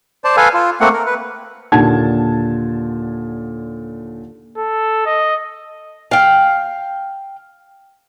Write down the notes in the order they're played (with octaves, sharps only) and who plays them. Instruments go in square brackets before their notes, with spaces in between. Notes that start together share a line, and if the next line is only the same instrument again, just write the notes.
[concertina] C5 D5 A5
A4 B4 F5 G#5
F4
A3 A#3 C4 F#5
A#4
B4
[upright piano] D#2 A#2 D3 F#5 A5 G#6
[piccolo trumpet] A4
D#5
[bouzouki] F5 G5